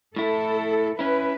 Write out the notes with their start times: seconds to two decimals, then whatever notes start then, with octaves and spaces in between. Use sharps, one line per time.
0.16 A2 E4 A4
0.99 C#4 E4 B4